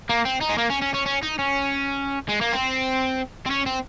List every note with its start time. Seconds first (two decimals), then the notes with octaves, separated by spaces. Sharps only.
0.09 A#3
0.25 C4
0.41 D#4
0.50 G#3
0.58 A#3
0.70 C#4
0.82 C#4
0.94 C#4
1.06 C#4
1.23 D#4
1.39 C#4
2.29 G#3
2.41 A#3
2.53 C4
3.46 C4
3.50 C#4
3.66 C4